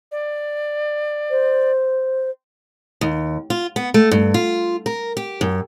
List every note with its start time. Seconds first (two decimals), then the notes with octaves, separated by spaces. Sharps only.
0.12 D5
1.30 C5
3.01 D#2
3.50 F4
3.76 B3
3.94 A3
4.11 G2
4.34 F4
4.86 A#4
5.17 G4
5.41 F#2